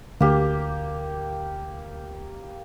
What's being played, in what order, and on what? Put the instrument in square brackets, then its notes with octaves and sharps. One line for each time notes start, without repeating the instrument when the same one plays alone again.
[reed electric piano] D2 [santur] A#3 G4